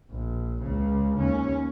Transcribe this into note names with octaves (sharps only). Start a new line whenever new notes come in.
A#1
C#2 C#3
D#2 C#4